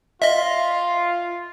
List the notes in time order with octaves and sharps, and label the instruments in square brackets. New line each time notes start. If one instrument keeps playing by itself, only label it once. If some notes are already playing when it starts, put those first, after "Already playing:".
[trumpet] F4 [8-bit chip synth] D#5 E5